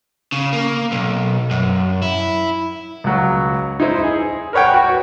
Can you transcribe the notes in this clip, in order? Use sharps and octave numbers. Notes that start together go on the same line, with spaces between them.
C#3
A#3
B1
F#2
E4
C#2 F#3
D#4 E4 C5
G#4
A#4 B4 C#5 F#5 G5
F#4